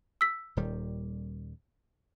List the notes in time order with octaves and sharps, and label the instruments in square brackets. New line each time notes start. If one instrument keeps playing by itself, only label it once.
[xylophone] E6 B6
[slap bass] D#1 D#3 G3